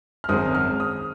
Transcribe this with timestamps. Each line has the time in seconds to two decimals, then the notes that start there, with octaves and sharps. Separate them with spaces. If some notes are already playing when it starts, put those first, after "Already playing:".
0.24 F6
0.28 G#1 F#2 D#3 G#3 C4 D#6
0.55 F6
0.80 D#6